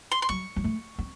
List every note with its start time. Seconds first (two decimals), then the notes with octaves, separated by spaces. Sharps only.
0.12 C6
0.22 C6
0.29 F#3 C#6
0.56 F#3
0.64 A3
0.98 C4